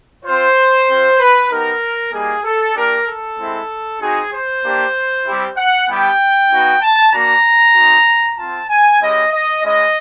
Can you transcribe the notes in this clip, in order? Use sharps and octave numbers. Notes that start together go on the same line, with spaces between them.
C4 F4 C5
C4 F4
B4
B3 D#4 G4 A#4
G3 A#3 D#4 G#4
A4
A#3 D4 G4 A#4
A4
G#3 C4 E4
C4 D#4 F#4 G#4
C5
A#3 D4 G4
G3 C4 E4 G4
F#5
G3 B3 E4 G4 G5
B3 D#4 F#4
A5
A#3 D4 F#4 A#5
C4 D#4 F#4
C4 F4 A5
G#5
G#3 C#4 E4 G4 D#5
D#5
G#3 C#4 E4 D#5